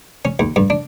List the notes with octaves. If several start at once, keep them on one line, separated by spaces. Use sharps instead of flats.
C#4
D#2
G2
D4